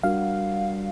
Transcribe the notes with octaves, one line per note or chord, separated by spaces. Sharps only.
G3 D4 F#4 A#4 F5